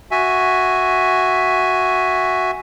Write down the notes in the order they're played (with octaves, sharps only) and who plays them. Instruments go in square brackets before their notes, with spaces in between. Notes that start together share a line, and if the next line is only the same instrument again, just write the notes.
[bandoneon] F#4 E5 G#5